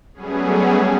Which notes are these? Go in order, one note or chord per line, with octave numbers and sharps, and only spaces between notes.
F#3 G3 A3 B3 C#4 G#4